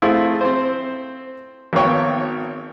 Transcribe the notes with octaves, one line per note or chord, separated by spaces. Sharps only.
A3 C4 E4 F4 G#4
C4 C5
G#1 A#3 B3 C#5 G5